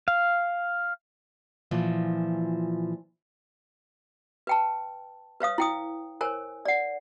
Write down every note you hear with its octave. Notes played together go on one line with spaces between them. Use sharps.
F5
A#2 E3 F3
B4 G5 A5
B4 C#5 F5 D#6
E4 G5 D#6
A#4 C5 C#5 G#5
D5 F#5